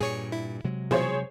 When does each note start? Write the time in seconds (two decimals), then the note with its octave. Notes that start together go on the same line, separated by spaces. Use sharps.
0.01 G2 A#2 G#4 C#5 C#7
0.32 E4
0.64 C3 F#3 G#3
0.91 B2 E3 F3 G#4 C5 C#5